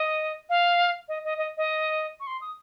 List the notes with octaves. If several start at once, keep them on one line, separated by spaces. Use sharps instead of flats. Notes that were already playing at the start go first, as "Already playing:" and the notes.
Already playing: D#5
F5
D#5
D#5
D#5
D#5
C#6
C6
D#6